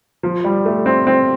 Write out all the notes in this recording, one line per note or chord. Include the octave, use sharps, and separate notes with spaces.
F3
G3
A3
C4
C4